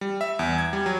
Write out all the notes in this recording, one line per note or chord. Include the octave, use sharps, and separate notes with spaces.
G3
E5
E2
G#6
G3
F#3